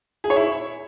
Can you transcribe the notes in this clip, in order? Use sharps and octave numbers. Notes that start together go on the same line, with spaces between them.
G#4
C#5
E4